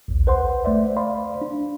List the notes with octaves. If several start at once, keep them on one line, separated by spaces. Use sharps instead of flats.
A#1 D#2
B4 C5 F#5 C6
A3 C5 D5 E5
C5 D5 F5 B5 C6
D4